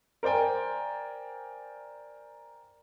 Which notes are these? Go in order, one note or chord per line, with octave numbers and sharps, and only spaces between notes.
A#4 C5 D5 G5 G#5